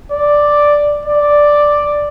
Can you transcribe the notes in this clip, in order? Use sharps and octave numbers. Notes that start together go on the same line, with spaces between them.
D5
D5